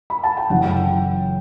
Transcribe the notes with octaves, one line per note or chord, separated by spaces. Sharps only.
B5
A5
G5
F#1 F#2 C#3 E3 F#5
G5